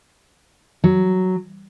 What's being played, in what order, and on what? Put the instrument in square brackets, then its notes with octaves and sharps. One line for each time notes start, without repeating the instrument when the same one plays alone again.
[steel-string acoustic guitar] F#3